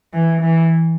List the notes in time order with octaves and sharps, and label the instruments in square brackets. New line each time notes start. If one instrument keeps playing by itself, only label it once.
[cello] E3
E3